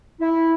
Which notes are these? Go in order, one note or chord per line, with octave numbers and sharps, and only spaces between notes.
E4